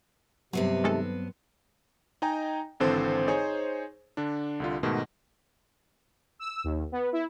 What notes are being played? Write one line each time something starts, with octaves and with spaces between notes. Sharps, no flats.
G2 C3 F#3 B3 C4
D#3 G#3 A4
D#4 D#5 G5 G#5 A#5
G#1 D3 E3 C4 A4 C5
D#4 G#4 C5 C#5 G#5
D3 D4
C2 D3 F4
G#2 B2 D#3 A3
E6
D#2
B3
E4